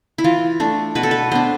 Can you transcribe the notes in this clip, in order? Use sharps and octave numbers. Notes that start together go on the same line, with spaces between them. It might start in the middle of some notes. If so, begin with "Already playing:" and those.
E4
E3 F4
A3 D4
B2 B4
A4
B4
B3 D4 C5